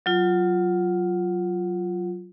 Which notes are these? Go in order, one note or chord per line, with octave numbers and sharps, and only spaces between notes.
F#3 F4